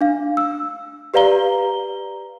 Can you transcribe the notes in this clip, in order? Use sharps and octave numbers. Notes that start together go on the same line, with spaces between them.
D4 F5
E6
G4 B4 D5 F5 A#5 G7